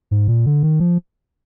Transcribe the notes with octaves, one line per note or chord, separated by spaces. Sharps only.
G#2
A#2
D3
D#3
F3